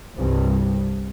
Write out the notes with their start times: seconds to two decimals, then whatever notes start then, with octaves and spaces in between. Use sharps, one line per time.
0.16 C2 G2